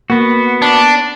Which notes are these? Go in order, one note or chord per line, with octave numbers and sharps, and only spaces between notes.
A#3 B3 F#4
D4